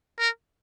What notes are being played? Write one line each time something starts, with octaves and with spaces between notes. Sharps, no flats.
A#4